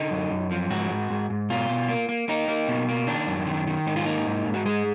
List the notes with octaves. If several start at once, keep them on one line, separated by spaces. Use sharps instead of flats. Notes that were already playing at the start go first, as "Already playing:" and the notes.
Already playing: D3 D#4
F#2
F#2
F3
G#2 F#4
G#2
G#2
G#2
B2 F4
B2
A#3
A#3
A#3 D#4
A#3
B2
A#3
D#3 D4
F#2
D#3
D#3
G#2 D#4
F4
A#3 D#4
G#2
G#2
F#4
G#3 G#4